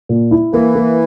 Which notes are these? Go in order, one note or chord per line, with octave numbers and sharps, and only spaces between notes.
A#2
E4
E3 A#3
A#3